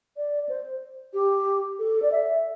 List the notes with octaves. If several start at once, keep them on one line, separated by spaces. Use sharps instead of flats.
D5
C5
G4
A4
D5
E5